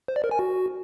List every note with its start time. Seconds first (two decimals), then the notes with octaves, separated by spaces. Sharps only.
0.08 C5
0.16 D5
0.24 A#4
0.31 G#5
0.39 F#4